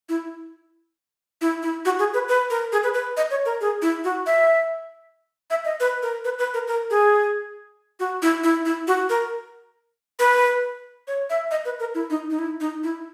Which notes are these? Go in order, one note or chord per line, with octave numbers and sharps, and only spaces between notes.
E4
E4
E4
F#4
G#4
B4
B4
A#4
G#4
B4
B4
D#5
C#5
A#4
G#4
E4
F#4
E5
E5
D#5
B4
A#4
B4
B4
A#4
A#4
G#4
F#4
E4
E4
E4
F#4
A#4
B4
C#5
E5
D#5
B4
A#4
E4
D#4
D#4
E4
D#4
E4